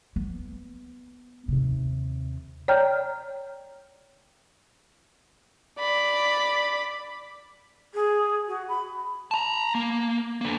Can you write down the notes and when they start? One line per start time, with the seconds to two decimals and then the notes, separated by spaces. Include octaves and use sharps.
0.16 B3
1.48 D#2 C3
2.68 C#5 D5 G5 A#5 F6 G6
5.78 D5 B5
7.94 G#4
8.48 F#4
8.69 B5
9.31 A5 A#5
9.75 A#3
10.41 D3 A#3